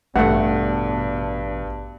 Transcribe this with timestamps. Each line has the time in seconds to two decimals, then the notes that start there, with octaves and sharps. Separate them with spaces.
0.16 A1 G2 B2 A3 D4 F#5